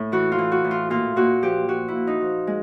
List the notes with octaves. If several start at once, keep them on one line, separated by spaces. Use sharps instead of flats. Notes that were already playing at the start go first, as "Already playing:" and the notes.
Already playing: A2 E4
E3 F#4
F4
E3
F#4
A2
F4
A#2 F4
A#2 F#4
F3 G4
F3 F#4
E4
A#2
D#4
F3
G#3